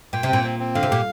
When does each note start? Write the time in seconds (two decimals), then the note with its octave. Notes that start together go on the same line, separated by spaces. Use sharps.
0.13 A#2 G5
0.23 C3
0.28 A#2 C4
0.44 C4
0.60 C4
0.75 D3 F5
0.83 C3
0.90 A#2 G4